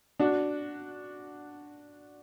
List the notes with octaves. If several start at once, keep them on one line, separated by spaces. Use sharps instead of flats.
D4 F#4